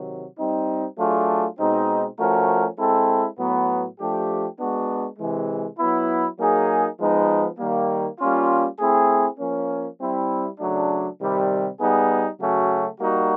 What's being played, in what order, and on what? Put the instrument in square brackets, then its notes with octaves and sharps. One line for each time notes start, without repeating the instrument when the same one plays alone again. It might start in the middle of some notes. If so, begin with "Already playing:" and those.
Already playing: [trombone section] C3 D#3 F#3
G3 C4 D#4
F#3 A3 D4 F4 G#4
B2 G#3 C4 D#4
F3 A3 C#4 F#4 A#4
G#3 C4 E4 A4
A2 F#3 B3
F3 A3 D4 G4
G#3 B3 D4 F#4
C3 E3 G#3
F#3 B3 E4
F#3 A#3 D#4 G#4
F3 G#3 B3 D#4
D#3 G3 A#3
G3 A#3 C#4 F4
A3 C4 E4 G#4
F3 A#3 C#4
G3 C4 E4
C#3 F#3 A3 D4
C3 D#3 G3
G3 B3 D#4 G#4
C#3 F#3 A3 C#4 F#4
G3 A#3 D#4 F#4